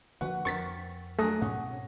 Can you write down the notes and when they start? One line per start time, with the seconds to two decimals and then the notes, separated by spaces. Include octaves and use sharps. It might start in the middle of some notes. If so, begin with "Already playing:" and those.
0.21 D3 F3 A#3 F#4 B4 F#5
0.45 F2 C4 A#4 C5 C#6 A6 B6
1.19 F#3 A3 D4 G#4 D#6 A#6
1.42 G#2 B2 C4 C#4 F#5